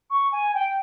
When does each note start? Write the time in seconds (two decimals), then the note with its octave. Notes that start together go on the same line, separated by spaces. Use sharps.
0.10 C#6
0.32 G#5
0.54 G5